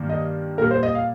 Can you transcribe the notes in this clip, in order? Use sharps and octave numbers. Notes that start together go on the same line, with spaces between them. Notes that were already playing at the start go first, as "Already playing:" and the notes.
Already playing: G2 D#3 A#3
D#5
A#2 G3 A#3 A#4
C5
D#5
F5